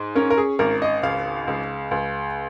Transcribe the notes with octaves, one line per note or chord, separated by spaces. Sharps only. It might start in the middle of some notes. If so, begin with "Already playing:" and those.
Already playing: G#2
C#4 A#4
A#4
G#4
G#1 A#4
D#5
C#2 F5
C#2
C#2